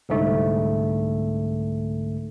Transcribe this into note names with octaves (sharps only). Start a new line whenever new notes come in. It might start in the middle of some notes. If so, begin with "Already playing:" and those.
C2 G#2 D3 A3